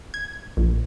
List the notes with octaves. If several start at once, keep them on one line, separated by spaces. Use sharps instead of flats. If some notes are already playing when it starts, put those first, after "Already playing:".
G#6
A#1